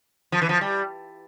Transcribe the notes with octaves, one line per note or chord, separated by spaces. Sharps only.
F3
E3
F3
G3